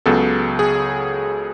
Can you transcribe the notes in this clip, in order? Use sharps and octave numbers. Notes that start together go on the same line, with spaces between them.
C#2 C#3 F#3 B3 A4
G#4